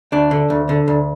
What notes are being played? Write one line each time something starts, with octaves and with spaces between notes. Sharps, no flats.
D2 D4
D3
D2
D3
D2